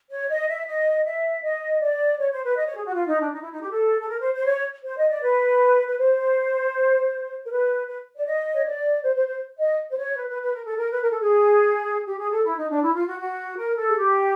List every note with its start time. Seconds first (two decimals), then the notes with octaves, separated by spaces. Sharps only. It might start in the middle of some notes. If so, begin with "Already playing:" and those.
0.10 C#5
0.29 D#5
0.48 E5
0.67 D#5
1.05 E5
1.43 D#5
1.81 D5
2.19 C#5
2.32 C5
2.44 B4
2.57 D#5
2.66 C#5
2.76 G#4
2.86 F#4
2.95 F4
3.07 D#4
3.20 D4
3.32 D#4
3.42 E4
3.52 D#4
3.62 G4
3.71 A4
4.00 A4
4.09 A#4
4.21 C5
4.34 C5
4.46 C#5
4.85 C5
4.97 D#5
5.10 D5
5.22 B4
5.87 B4
5.98 C5
7.46 A#4
7.51 B4
7.88 B4
8.17 D5
8.26 D#5
8.54 C#5
8.64 D5
9.03 C5
9.15 C5
9.28 C5
9.59 D#5
9.91 C5
9.97 C#5
10.16 B4
10.29 B4
10.41 B4
10.53 A#4
10.65 A4
10.77 A#4
10.92 B4
11.01 A#4
11.11 A4
11.21 G#4
12.06 G4
12.18 G#4
12.31 A4
12.44 E4
12.57 D#4
12.70 D4
12.82 E4
12.95 F4
13.08 F#4
13.20 F#4
13.58 A#4
13.77 A4
13.88 G#4
13.96 G4